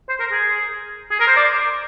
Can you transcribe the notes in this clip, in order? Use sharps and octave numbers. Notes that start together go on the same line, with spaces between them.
C5
A#4
G#4
G#4
A#4
C5
D5